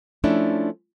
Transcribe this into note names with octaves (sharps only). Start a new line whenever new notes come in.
F3 A3 C#4 D4 E4